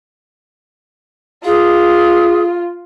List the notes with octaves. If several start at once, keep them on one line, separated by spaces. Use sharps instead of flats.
F4 G#4